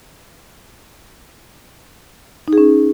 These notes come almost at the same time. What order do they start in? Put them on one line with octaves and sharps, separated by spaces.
D#4 G#4 C#4